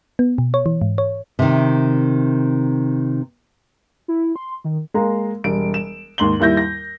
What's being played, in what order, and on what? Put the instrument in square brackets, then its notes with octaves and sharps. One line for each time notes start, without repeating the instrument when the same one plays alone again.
[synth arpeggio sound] B3
B2
C#5
E3
G#2
C#5
[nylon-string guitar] C3 D#3
[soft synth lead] E4
C6
D#3
[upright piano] G#3 A#3 A#5
E1 G3 D7
E7
D#2 G#2 C6 F#7 G7
D#2 G3 E4 G6 A#6
A#6